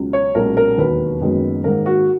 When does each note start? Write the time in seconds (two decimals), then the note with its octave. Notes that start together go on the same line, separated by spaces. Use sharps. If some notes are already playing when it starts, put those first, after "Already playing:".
Already playing: C#2 B2 F#3
0.13 C#5
0.35 B1 A#2 G#3 C#4 A#4
0.57 A#4
0.78 E1 D#2 D#3 F#3 B4
1.21 F#1 F#2 D#3 G#3 B3
1.64 G#2 D#3 A#3 A#4
1.86 F#4